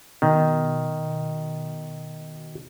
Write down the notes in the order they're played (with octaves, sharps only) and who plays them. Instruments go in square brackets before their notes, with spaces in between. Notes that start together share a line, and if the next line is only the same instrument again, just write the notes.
[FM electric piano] B2 [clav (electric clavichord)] D#3